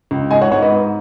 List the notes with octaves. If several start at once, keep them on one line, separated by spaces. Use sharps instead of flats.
C#2
G#2 D#5 G#5
C#5 F#5
G#2 C#5 F#5
B4 D#5
G#2